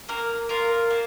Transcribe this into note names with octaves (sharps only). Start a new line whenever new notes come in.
A#3 A#4
F4 A#4
A#3